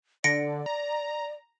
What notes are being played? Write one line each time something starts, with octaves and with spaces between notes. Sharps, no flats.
D3 D5 A#6 C#7 D7
A#5